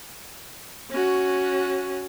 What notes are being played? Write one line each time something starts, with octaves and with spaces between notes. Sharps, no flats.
C#4 F#4